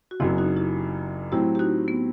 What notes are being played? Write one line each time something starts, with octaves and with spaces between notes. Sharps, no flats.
F#4
F#1 F#2 F#3 C4 E4
D#4 F#4
E4 G4
A2 F#3 C4 E4 G4
G4
D#4 F#4
B3